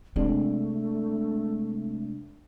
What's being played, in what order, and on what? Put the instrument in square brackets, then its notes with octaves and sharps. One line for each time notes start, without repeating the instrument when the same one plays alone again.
[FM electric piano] C3 G#3 D4 [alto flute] A3 [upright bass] C4